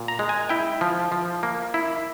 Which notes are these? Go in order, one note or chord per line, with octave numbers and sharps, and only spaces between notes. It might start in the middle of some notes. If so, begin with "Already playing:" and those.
Already playing: A#2
A#5
G#3
G#5
E4 G5
F3
F3
A#3
E4